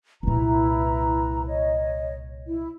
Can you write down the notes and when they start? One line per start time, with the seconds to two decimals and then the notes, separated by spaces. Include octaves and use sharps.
0.23 C2 A#2 E4 B4 A#5
1.46 C#5 D#5
2.47 E4